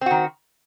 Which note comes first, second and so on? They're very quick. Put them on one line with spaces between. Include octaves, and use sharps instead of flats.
C4 F#4 D#3